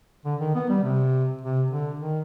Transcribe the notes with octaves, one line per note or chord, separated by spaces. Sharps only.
D3
D#3
B3
G3
C3
C3
D3
D#3